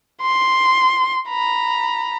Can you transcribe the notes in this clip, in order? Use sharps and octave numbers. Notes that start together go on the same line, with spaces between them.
C6
A#5 B5